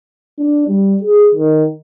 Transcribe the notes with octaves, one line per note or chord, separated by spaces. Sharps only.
D4
G3
G#4
D#3